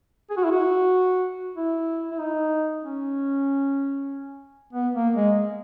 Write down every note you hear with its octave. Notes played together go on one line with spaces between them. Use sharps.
G#4
F#4
E4
F#4
E4
E4
D#4
C#4
B3
A#3
G#3